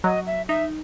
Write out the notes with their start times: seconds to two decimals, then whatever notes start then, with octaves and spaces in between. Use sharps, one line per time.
0.04 F#3 D#5
0.27 E5
0.48 D#4 E5